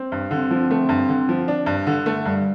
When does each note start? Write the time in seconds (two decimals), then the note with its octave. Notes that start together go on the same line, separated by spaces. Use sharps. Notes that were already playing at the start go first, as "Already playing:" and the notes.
Already playing: C4
0.12 G2
0.31 D3 C4
0.51 F3
0.71 A3
0.89 G2
1.09 D3
1.29 F3
1.48 D4
1.66 G2
1.87 D3
2.06 A3
2.25 G2 G3